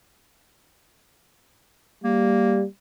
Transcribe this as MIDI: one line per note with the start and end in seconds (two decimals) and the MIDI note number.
2.04 2.65 55
2.04 2.65 58